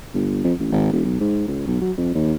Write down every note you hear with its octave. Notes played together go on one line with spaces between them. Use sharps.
G1
F2
A1
G#1
E1
B1
G#2
C#2
B1
F#3
F2
D#2